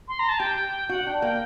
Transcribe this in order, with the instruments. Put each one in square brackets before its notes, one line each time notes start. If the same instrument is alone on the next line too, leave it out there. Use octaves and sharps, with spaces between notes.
[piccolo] C6
A#5
A5
[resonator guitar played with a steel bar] G4 [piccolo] G5
[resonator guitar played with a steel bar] F#4 [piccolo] F#5
[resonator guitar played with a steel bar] D4 [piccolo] G5
[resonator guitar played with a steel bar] A#3 [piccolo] G5